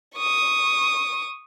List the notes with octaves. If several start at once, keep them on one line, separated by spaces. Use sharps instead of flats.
C#6 D#6